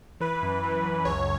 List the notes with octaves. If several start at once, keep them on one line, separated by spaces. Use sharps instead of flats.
E3 B4
F#2
E3
F#2
C#2 C#5